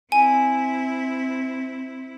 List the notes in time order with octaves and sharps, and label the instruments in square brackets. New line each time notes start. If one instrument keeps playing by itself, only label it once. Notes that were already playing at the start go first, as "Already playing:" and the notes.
[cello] C4 E4 [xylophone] G#5